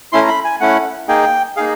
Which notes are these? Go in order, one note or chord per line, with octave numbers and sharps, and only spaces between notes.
A3 C#4 E4 C6
A#5
B5
G#5
A3 C#4 E4 F#5
A#3 D#4 G#4 G5
A#3 D#4 G#4 F5